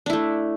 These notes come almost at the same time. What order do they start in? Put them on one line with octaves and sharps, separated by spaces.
D4 E4 A3